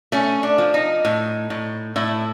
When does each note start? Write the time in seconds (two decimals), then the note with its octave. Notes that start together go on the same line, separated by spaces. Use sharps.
0.12 A3 C#4
0.43 D4
0.58 F3
0.74 D#4
1.05 A2
1.50 A2
1.96 A2 E4